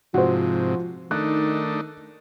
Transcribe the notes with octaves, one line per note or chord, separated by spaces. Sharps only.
G#2 C3 F3 F#4 C5
D#3 A3 D4 D#4 F#6